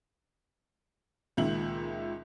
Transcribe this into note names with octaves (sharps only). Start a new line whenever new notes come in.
C#2 A#2 D#3 E5 F#7